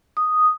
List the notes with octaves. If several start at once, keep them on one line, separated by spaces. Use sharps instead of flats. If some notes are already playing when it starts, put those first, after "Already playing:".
D#6